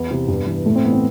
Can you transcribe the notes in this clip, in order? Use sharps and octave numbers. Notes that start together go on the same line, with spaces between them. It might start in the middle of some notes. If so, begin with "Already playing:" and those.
Already playing: E2 B3
C3 E3
G2
E3
A2 A3
C4
E3 B3
C4